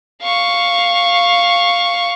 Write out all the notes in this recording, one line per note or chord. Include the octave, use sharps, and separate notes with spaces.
F5 C#6